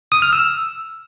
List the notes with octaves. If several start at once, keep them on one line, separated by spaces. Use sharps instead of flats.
D#6
F6
E6